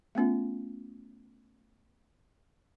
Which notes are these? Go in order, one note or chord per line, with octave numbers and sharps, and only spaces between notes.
A3 B3 C#4 F4